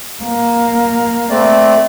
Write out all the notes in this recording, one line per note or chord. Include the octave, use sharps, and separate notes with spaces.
A#3
A3 C4 D5